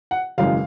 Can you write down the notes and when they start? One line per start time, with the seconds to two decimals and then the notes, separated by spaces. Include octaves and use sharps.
0.11 F#5
0.38 G#1 F#2 C#3 E3 G#3 F5